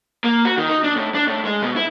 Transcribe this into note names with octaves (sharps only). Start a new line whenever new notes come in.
A#3
F#4
D#3
D#4
D4
A2
D4
A2
G#3
B2
E4